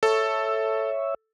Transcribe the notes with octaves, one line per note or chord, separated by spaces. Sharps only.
A4 C#5 E5